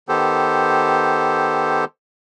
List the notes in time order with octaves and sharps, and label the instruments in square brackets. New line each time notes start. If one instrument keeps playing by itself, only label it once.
[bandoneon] D#3 B3 G4 A4 C5